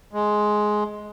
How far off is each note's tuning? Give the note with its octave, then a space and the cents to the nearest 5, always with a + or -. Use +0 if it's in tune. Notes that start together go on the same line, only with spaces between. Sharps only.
G#3 +10